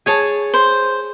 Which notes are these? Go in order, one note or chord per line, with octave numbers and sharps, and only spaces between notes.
G#4 C#5 A5
C5